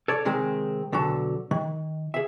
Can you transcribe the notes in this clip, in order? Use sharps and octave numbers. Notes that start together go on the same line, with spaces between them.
A4 C#5 D5
C3 D#3 G#3 C4
B1 D3 F#3 F#4 A5
D#3
G#4 E5